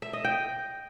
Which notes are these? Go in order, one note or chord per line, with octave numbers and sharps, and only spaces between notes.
E5
D#5
G5